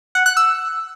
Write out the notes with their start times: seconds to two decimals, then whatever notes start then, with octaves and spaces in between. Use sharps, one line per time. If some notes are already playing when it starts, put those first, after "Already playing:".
0.15 F#5
0.26 F#6
0.37 E6